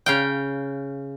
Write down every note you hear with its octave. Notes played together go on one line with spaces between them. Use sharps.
C#3 F5 G5